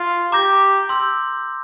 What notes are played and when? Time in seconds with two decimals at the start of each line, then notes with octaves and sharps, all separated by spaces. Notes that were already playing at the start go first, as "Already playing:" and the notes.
Already playing: F4
0.32 G4 A#5 D6 G6 A#6
0.89 C6 E6 G6